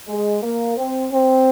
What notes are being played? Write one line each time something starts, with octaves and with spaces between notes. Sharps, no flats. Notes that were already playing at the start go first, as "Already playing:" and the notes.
G#3
A#3
C4
C4